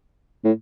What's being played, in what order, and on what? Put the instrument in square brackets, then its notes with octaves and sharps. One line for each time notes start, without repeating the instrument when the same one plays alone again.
[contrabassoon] A2